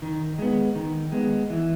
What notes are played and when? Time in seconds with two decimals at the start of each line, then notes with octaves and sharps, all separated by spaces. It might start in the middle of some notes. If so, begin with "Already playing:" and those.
0.02 D#3
0.39 G#3 B3
0.75 D#3
1.12 G#3 B3
1.50 E3